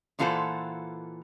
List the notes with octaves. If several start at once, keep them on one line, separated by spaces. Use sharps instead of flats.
A#2 E3 F4 A4 C5 F#5